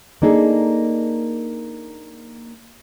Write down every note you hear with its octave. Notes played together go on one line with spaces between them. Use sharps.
A#3 D4 D#4 G#4 A4